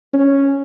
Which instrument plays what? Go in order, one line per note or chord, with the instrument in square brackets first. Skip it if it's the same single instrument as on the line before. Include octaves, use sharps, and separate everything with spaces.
[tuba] C#4